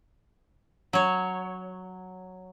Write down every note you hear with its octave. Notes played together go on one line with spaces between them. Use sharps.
F#3 C#5